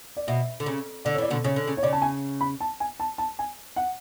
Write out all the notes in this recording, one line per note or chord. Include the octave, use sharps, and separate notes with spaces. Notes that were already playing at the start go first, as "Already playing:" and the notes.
D5
B2 E5
D3
C#3
D3 D5
C#5
E3 D5
B2 D3
C#3 C#5
D3
C#3
C#5
C#3 D5
A5
G#5
B5
A5
G#5
A5
A5
G#5
F#5